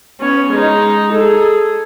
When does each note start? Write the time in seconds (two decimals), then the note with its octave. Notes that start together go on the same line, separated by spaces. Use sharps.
0.21 B3 C#4
0.52 G#3 D#4
1.13 G#4 A4